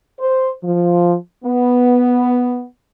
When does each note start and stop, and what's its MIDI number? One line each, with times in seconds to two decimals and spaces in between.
0.19 0.50 72
0.63 1.14 53
1.45 2.63 59